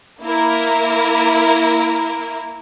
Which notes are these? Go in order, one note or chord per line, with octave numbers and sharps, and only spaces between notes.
A#3 E4 A#4